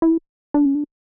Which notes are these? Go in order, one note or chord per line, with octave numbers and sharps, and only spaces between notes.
E4
D4
C#4
D4